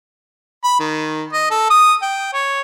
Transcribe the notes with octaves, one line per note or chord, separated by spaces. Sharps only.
B5
D#3
D#5
A4
D#6
G5
C#5